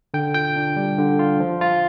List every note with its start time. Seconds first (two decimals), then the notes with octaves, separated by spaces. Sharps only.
0.14 D3 G5
0.34 F4 G5
0.56 D4
0.76 G3
0.98 D3
1.19 F4
1.40 F3
1.61 F4